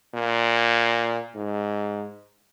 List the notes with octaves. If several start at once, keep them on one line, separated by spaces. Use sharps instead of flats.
A#2
G#2